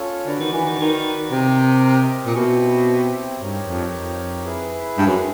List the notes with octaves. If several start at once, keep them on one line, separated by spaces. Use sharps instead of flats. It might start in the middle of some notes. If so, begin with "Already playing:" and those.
Already playing: C#4 F4 A4 C#5
D3 F#4 B4 D5 F#5
D#3
E3
D#3
D#3
C3 G4 A#4 D#5
A#2
B2 C4 E4 G4
G2 D#4 G4 A#4 C#5
F2
F2
E4 G#4 B4
G2
F#2